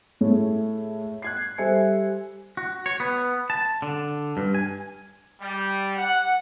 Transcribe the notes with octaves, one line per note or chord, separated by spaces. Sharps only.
A2 A3 G#4 C#5
F#6 G#6 C7
G3 A4 C5 E5 G#5 C#7
F#4
C#5
B3
A5
D3
G2
G#5
G3
F#5